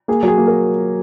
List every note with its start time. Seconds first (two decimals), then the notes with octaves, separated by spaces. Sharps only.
0.08 A#3 G#4
0.23 F#3
0.28 G#4
0.38 A#3
0.47 A#4